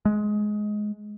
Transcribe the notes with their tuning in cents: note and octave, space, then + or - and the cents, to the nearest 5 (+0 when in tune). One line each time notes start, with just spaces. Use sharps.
G#3 +15